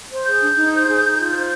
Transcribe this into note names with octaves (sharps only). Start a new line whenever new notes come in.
C5
G#4 G6
D4
D#4
C5
G#4
D#4
F4
C5